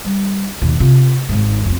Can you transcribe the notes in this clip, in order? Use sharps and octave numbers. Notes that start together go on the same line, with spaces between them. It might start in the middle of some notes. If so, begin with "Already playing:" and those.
G3
D#2 B2
C3 F4
G#1 G#2
F2 C4